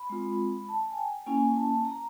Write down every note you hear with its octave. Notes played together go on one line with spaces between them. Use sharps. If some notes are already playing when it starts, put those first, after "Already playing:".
Already playing: B5
G#3 C4 F4
A5
G#5
G5
A#3 C#4 E4 G#5
A5
A#5